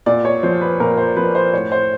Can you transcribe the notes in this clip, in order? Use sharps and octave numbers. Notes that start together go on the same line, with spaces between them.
A#2 D5
C#5
F3 C5
B4
A#2 A#4
C5
F3 B4
C5
A2 C#5
C5